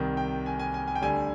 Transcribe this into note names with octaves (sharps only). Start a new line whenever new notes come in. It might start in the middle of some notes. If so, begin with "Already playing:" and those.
Already playing: C2 C3 D#3
G5
G#5
G#5
G#5
G#5
G5
D2 D3 G3 G#5